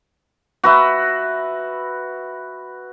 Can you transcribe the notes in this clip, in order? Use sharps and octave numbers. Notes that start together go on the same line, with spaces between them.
F#4 B4 E5